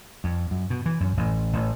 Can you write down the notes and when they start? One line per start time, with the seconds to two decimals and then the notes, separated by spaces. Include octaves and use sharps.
0.24 F2
0.51 F#2
0.70 B2
0.86 E3
1.00 F#2
1.17 A1
1.53 A1